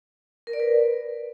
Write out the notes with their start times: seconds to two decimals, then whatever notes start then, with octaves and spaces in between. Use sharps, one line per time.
0.47 A#4
0.53 D5
0.60 B4